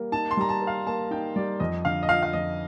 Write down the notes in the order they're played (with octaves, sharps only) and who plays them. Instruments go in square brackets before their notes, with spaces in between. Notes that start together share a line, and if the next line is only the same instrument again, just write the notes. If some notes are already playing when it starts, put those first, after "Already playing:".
Already playing: [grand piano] G3 A#3 A#4
[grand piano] D#4 [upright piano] A5
[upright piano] C6
[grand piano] G3 [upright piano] A#5
[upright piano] A5
[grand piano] A#4
[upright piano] F5
[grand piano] A#3 [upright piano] A5
[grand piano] D#4 [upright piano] G5
[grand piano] G3 [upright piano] D5
[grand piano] F2 [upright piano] D#5
[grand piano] D3 [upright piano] F5
[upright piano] D#5
[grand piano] F3 [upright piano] F5
[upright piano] F5
[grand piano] F2 [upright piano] D#5